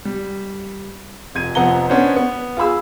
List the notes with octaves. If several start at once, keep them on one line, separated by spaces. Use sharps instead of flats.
G3
F1 G#6 D#7
F1 F3 B3 F#5 A#5 G7
B3 C#4 D4 C5
B3
F4 G#4 B5 E6